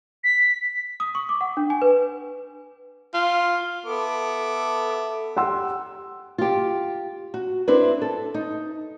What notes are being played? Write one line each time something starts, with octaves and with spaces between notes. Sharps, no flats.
B6
D#6
C#6
D6
F#5
D4
G#5
B4
F4
B3 A4 E5 D6
G4 F#5 C6 E6
F4 G4
F#4
C4 D4 E4 B4
A4
D#4